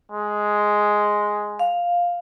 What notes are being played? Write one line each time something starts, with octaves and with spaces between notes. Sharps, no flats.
G#3
F5